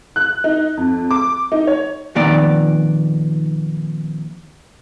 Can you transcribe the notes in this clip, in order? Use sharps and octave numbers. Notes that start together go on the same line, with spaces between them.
F#6
D#4
F2
D6
D#4
C#5
F2 A#2 D#3 B3 D5 A#5